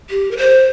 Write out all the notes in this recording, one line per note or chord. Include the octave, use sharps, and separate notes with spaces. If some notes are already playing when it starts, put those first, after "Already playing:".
G4
A#4
C5